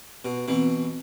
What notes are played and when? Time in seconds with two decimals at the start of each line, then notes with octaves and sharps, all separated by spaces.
0.25 B2
0.48 B2 E3 C4